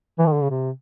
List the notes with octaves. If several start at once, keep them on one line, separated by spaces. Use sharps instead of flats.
E3
D#3
D3
C#3
C3